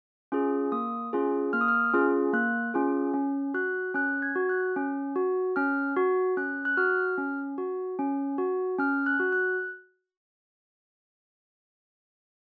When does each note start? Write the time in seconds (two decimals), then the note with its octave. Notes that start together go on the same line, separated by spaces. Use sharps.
0.32 C#4 F4 G#4
0.72 A#3 D#6
1.13 C#4 F4 G#4
1.53 A#3 F6
1.61 D#6
1.68 F6
1.94 C#4 F4 G#4
2.33 A#3 F#6
2.74 C#4 F4 G#4
3.14 C#4
3.54 F#4 F#6
3.94 C#4 F#6
4.22 G#6
4.36 F#4
4.49 F#6
4.76 C#4
5.16 F#4
5.56 C#4 F6
5.97 F#4
6.37 C#4 F#6
6.65 F#6
6.77 F#4 F6
7.18 C#4
7.58 F#4
7.99 C#4
8.38 F#4
8.79 C#4 F6
9.06 F#6
9.19 F#4
9.32 F#6